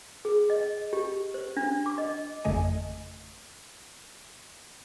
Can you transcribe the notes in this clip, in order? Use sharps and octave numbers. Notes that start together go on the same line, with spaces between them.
G#4
D#5
G4
C5
D4
D6
D#5
G#1 F2 C#3 A3 D#5 G#5